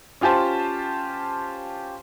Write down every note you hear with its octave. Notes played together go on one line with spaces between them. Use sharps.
C#4 F4 G4 C5 A5